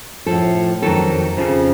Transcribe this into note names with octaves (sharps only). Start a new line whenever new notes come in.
A2 F3 A4
F2 D#3 F#3 A4
F2 C#3 F3